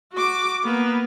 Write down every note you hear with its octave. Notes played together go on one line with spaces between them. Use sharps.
F#4 D6
A#3 B3